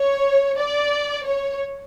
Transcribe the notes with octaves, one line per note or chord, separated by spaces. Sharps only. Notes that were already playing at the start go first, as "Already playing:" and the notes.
Already playing: C#5
D5
C#5